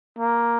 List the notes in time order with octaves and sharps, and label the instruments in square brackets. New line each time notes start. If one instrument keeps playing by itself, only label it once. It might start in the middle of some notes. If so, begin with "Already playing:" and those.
[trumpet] A#3